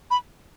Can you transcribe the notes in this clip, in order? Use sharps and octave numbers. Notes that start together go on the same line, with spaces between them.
B5